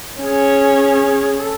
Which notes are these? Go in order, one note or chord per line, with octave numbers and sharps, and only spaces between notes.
C#4 G#4
A4